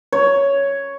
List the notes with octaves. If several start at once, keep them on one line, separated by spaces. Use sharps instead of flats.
C#5